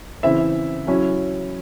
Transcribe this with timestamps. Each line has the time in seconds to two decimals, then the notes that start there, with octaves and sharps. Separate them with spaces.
0.23 C#3 E3 C4 E4 E5
0.87 F#3 C#4 E4